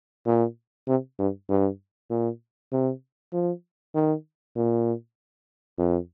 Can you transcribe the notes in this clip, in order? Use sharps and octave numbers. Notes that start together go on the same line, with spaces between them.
A#2
C3
G2
G2
A#2
C3
F3
D#3
A#2
F2